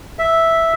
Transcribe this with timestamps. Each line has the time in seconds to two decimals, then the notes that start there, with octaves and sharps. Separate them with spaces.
0.19 E5